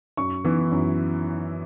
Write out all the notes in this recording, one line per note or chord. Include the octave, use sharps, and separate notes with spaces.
F#2 C#6
E3 B3 E4
F#2